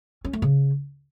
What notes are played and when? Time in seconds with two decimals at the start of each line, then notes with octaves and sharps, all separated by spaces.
0.25 C#4
0.33 A3
0.42 C#3